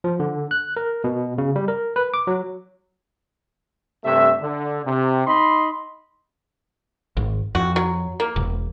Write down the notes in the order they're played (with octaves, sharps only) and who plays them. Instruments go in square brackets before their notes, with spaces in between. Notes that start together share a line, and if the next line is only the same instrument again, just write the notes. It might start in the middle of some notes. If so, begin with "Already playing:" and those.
[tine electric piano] F3
D3
F#6
A#4
B2
C#3
G3
A#4
B4
D6
F#3
[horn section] G2 C3 A3 E5
D3
C3
D#4 D#5 B5 C6
[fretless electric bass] G#1
[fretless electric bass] F2 [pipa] F#4
[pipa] F#3
A#3
[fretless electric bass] E1